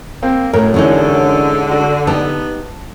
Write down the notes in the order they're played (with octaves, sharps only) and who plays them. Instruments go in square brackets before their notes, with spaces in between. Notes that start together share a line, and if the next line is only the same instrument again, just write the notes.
[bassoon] A#3 [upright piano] C4
[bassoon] F#2 [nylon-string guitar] A2 [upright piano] A#4
[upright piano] E2 A2 [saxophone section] D3 [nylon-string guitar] G#3 C#4 D#4
[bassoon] F#4
[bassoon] B3 [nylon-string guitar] D#4 G4 [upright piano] A5